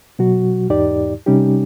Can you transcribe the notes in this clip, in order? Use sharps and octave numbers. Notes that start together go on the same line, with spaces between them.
B2 F#3 F#4
E2 G#2 D#4 G4 D5
C3 G3 C#4 D#4 G4